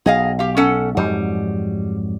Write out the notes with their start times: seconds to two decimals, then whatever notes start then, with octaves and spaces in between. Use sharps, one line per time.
0.06 B1 G#4 D#5 F5
0.39 G4 F5
0.57 C#4 A4 F#5
0.97 F2 G#2 F#3 G3